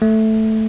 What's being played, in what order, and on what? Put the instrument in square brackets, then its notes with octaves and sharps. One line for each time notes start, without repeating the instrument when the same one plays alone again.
[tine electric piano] A3